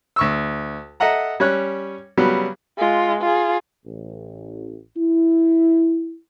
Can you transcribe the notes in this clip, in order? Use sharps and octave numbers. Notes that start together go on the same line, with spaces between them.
D2 C#6 E6
A4 D#5 E5 F#5 A#5
G3 C#4 C#5 F#6
C#3 F#3 G3 B3
G#3 F4
F4 G#4
A1
E4